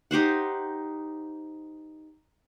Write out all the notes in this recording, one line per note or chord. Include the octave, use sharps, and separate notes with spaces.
D#4 G4 C5 F#5